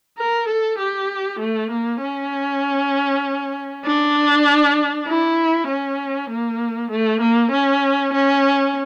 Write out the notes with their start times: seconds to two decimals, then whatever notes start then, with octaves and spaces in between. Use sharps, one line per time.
0.18 A#4
0.48 A4
0.78 G4
1.40 A3
1.71 A#3
2.01 C#4
3.85 D4
5.08 E4
5.69 C#4
6.30 A#3
6.91 A3
7.21 A#3
7.52 C#4
8.14 C#4